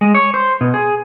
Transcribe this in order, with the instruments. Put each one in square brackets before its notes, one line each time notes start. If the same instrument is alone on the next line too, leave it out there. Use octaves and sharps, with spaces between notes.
[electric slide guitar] G#3
C#5
C5
B2
G#4